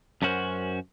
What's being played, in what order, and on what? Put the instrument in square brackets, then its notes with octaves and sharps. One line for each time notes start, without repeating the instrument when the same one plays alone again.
[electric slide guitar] F#2 A3 C#4 F#4 A#4 C5